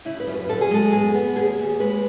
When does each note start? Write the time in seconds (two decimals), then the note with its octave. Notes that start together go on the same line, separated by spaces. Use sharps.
0.05 C#3 E4
0.20 B4
0.27 F#2
0.34 B4
0.49 F#2 A4
0.61 G#4
0.71 G#3 A4
0.93 B3 G#4
1.14 B3
1.36 D#2 G#4
1.58 D#2
1.80 G#3 B4